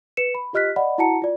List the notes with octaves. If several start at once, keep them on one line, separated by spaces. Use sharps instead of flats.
B4 C#7 E7
B5
F4 G4 D#5 F6 F#6 B6
D5 D#5 F#5 B5
E4 F#4 F#5 A5 A#5 C#7
F4 D5